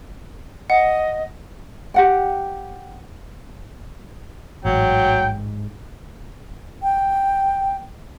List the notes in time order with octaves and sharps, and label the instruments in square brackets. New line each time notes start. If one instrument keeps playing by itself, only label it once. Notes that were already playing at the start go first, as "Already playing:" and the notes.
[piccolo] D#5 [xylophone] F#5
[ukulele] G4 F#5 G5
[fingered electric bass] A1 [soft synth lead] G#2 [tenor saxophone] F#3 [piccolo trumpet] G5
[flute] G5